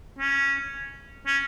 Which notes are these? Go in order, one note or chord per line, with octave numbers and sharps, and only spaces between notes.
C#4
C#4